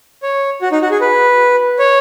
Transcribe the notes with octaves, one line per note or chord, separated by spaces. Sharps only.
C#5
F#4
D#4
F#4
G#4
B4
C#5